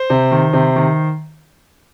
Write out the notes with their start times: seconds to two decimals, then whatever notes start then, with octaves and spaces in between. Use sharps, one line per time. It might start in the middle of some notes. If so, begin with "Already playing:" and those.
Already playing: C5
0.10 C3
0.31 D#3
0.53 C3
0.76 D#3